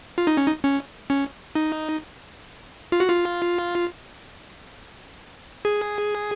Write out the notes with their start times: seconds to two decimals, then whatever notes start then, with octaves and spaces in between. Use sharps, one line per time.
0.18 F4
0.27 D#4
0.37 C#4
0.47 D#4
0.64 C#4
1.10 C#4
1.55 D#4
2.92 F4
3.00 F#4
3.09 F4
5.65 G#4